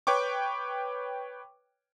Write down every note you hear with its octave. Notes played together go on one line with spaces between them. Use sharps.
B4 C#5 G5 C#6 D6